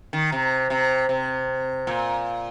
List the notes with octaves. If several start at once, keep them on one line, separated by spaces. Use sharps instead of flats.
D#3
C3
C3
C3
A#2